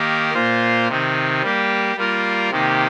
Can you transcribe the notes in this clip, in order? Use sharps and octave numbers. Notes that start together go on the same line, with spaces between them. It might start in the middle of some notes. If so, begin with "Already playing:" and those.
Already playing: D#3 A#3 G4 A#4
A#2 A#3 F4 C5
C3 D#3 C4
G3 A#3 G4
G3 A#3 F4 A#4
C3 D#3 A#3 G4